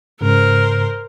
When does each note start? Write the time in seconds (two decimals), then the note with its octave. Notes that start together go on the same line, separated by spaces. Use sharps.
0.21 G#2 C#3 A#4 C5